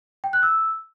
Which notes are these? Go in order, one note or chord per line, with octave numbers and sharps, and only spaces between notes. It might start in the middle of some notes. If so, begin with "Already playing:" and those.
G5
F#6
E6